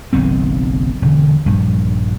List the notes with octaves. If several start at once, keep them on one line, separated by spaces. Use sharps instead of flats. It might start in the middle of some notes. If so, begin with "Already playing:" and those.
F#1 B1 D#3 C4
E1 D3
A#1 G2